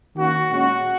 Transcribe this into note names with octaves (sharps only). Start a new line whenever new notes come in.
D#3 A#3 C#4 F#4
A#2 G#3 C#4 F#4